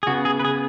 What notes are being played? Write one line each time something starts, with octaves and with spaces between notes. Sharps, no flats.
G#4
C#3 B3 F#4
G#4
B4
G#4